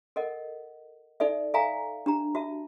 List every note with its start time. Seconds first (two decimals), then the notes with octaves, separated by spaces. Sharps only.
0.16 A4 A#4 D#5 F#5
1.20 D#4 A4 D5 E5
1.54 A4 E5 F5 G#5 A#5
2.06 D4 G4 A#5
2.35 F#4 E5 A5